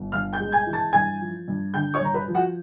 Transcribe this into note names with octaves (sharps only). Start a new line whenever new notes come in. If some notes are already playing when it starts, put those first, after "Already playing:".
Already playing: G1
G2 F5 F6
G5 G6
G#3
G#5 G#6
E3
A5 A6
G2 G#5 G#6
F3
G2
D3 G5 G6
C#5 C#6
G2 A#5
B4 B5
F3
F#4 F#5